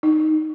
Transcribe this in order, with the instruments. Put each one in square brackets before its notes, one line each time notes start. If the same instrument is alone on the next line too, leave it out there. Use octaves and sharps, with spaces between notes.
[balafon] D#4